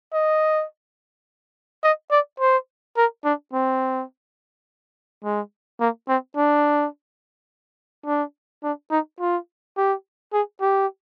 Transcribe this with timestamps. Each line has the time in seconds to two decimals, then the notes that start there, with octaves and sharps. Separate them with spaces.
0.13 D#5
1.83 D#5
2.11 D5
2.40 C5
2.97 A#4
3.25 D4
3.53 C4
5.24 G#3
5.80 A#3
6.08 C4
6.36 D4
8.06 D4
8.64 D4
8.91 D#4
9.20 F4
9.77 G4
10.33 G#4
10.61 G4